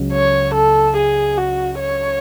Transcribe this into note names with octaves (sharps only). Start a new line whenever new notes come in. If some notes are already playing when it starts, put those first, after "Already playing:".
Already playing: C#2 C#3 F#3
C#5
A4
G#4
F#4
C#5